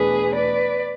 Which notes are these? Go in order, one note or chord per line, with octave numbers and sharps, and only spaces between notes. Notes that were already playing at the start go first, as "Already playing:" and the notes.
Already playing: E2 B2 A3 D4 G#4 B4
B4 D5